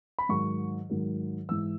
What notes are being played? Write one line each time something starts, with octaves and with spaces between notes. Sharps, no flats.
B5
G#2 D#3 F#3 C#6
G#2 D#3 F#3
G#2 E3 E6